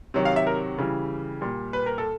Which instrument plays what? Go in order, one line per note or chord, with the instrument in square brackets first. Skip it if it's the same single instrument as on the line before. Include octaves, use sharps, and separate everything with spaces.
[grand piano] C3 D#3 F#3
F5
E5
A#4
C#3 E3 G3
A#2 G3
B4
A#4
A4